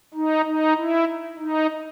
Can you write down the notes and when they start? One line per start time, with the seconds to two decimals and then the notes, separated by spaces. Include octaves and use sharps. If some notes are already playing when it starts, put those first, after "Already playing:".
0.14 D#4
0.46 D#4
0.76 E4
1.39 D#4